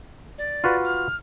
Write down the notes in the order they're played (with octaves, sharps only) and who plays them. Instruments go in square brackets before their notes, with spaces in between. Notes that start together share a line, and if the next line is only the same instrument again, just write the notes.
[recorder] D5
[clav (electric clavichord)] F4 F#4 B4
[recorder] F6